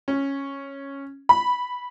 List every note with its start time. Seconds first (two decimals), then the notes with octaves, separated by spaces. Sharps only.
0.08 C#4
1.29 B5